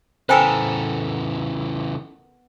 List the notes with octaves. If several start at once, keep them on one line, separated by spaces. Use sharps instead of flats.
C#3 E3 B3 A4 A#4 C5 G5 G#5